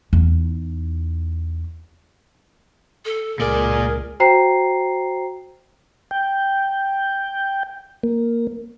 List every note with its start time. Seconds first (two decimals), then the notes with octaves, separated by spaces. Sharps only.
0.13 E2 D#4
3.05 A4
3.40 C#2 A#2 G#4 A#4 D5
4.20 F#4 C5 G5 A#5 C7
6.11 G5
8.03 A#3